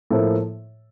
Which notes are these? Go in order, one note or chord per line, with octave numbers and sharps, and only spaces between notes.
A2 F3 A#3 E4 A4